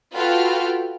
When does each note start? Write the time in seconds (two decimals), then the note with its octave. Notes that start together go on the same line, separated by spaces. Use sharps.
0.14 F4 F#4 A4 B4 G5 F6